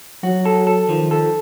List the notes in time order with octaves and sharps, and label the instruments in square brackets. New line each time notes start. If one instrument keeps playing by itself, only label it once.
[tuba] F#3 [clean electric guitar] F#4
[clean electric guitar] A4
A4
[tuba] D#3 [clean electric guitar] F3
[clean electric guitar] A4